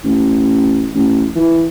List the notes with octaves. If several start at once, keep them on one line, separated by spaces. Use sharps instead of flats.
A1
A1
E3